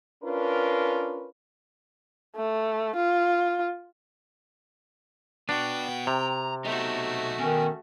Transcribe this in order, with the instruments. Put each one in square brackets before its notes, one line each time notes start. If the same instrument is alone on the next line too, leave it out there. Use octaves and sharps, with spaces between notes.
[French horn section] C#4 D4 F4 A#4 B4
[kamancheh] A3
F4
[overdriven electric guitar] B3 F#4 [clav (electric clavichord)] D4 [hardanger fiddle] G5
[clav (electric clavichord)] C3 [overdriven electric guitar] A#5
[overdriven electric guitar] B2 D#4 [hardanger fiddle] A3 F#4
[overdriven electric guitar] B2 [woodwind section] D#3 C#4